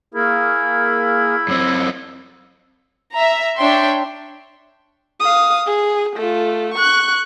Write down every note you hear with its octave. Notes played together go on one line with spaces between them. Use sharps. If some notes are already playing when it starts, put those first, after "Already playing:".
A#3 E4 G#4 A#4
F#2 C4
E5 A#5
D4 C#5 E5 G5 C6
F5 D#6
G#4
A3 F4
C#6 F#6